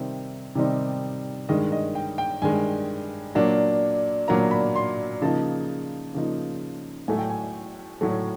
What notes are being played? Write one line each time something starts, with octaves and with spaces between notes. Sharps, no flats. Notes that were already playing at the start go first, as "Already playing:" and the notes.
Already playing: C3 D#3 G3 C4 D#4 E5
C3 D#3 G3 C4 D#4
G2 D#3 G#3 D#5
D#5
G5
G5
G2 D#3 G#3 G#5
A#2 F#3 A#3 D4
A#2 F#3 A#3 D4 A#5
B5
C6
C#3 F3 A#3 D#4 A5
C#3 F3 A#3 D#4
A2 F#3 A3 G#5
G5
G#5
A2 F#3 A3